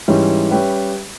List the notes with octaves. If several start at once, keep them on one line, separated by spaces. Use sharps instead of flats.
G#2 E3 G3 C#4
G3 C#4 G4 B4 E5